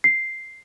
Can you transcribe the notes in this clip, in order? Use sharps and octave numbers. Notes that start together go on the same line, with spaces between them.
C7